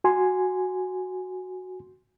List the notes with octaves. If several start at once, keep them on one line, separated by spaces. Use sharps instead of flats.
F#4 G#5 C6